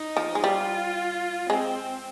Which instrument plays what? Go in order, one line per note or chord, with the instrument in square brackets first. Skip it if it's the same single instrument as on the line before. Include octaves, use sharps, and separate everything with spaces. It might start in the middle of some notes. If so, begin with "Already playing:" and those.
Already playing: [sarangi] D#4
[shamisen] F3
G#3
[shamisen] G3 [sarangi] F4
[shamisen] G#3 [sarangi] C4